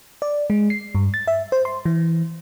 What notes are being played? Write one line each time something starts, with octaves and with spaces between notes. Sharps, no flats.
D5
G#3
C7
G2
A6
E5
C5
C6
E3